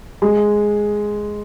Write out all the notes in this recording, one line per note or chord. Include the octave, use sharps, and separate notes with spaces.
G#3